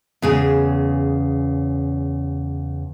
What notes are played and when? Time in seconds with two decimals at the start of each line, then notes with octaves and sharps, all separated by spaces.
0.22 E2 C#3 G#4